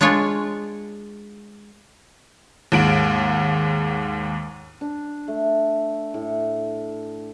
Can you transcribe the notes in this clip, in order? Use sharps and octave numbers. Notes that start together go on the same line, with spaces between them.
G#3 D4 F4 C#5
D#2 G#2 D7 F#7
D4
A3
A2